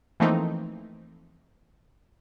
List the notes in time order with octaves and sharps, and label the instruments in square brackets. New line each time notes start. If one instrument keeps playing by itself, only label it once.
[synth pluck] E3 F3 A3 A#3 C4 D#4